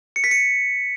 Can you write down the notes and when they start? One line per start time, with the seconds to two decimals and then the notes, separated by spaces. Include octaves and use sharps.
0.16 C#7
0.24 B6
0.31 C#7